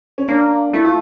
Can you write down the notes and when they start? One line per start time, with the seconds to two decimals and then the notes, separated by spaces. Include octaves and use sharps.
0.18 C#4
0.28 A#3 D4
0.73 A3 E4
0.85 F4